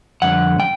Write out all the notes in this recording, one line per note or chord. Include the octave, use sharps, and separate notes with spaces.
F2 D3 G3 F#5
G3 G5